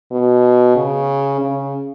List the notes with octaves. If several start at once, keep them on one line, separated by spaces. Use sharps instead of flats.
B2
C#3
C#3